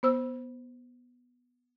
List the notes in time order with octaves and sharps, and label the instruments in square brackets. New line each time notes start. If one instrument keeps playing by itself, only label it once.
[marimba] B3 C5 E6